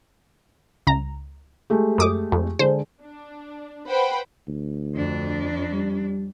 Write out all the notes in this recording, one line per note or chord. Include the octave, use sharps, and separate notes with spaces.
C#2 A#5
G#3 A3 G4
F#2 D6 D#6
F2
D3 G#3 C5
D4
B4 C5 F#5 G5 B5
D2
F2 D4
G3